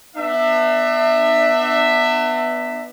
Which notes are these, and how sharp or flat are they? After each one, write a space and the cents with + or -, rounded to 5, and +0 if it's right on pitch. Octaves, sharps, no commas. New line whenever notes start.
B3 +0 D4 +40 E5 +0